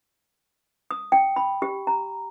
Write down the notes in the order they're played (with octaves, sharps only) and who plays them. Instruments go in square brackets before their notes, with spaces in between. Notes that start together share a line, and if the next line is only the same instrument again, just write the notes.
[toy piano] D#6
G5
B5
G4
A#5